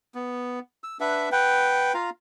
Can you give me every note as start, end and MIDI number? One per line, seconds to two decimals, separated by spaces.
0.15 0.59 59
0.84 0.98 88
1.00 1.29 62
1.00 1.29 71
1.00 1.29 76
1.00 1.29 78
1.32 1.93 71
1.32 1.93 78
1.32 1.93 79
1.94 2.10 65
1.94 2.10 77
1.94 2.10 82